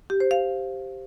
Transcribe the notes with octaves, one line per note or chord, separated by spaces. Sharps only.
G4
C5
F5